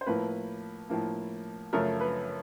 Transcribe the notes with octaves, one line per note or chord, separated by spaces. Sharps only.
C5
A2 F3 A#3 B4
A2 F3 A#3
F#2 C#3 F3 A3 A#4
B4